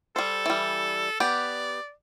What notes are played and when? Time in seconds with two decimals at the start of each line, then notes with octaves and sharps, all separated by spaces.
0.16 G3 A4 C5
0.46 E3 G3
1.20 B3 G4 D5